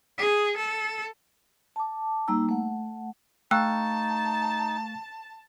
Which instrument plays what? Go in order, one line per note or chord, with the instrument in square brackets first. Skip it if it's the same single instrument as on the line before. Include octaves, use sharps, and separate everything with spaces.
[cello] G#4
A4
[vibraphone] A5 D6
G3 A#3 D#4 A#5 E6
A3 F#5
[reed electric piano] A3 F5 C#6 [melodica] D#4 [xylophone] G5 E6 F#6 [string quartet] A5